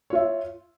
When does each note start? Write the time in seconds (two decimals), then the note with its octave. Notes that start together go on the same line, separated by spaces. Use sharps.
0.10 C#5
0.13 F4
0.15 E5